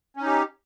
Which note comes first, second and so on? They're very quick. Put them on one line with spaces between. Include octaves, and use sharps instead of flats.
C#4 D#4 G4